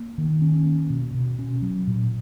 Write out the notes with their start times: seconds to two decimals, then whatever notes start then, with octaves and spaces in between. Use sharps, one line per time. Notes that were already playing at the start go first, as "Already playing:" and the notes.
Already playing: A#3
0.18 D#3
0.42 C#4
0.66 A#3
0.90 B2
1.14 B2
1.39 C#4
1.62 F#3
1.87 A#2